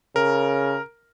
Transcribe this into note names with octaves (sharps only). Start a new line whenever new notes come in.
C#3 A#4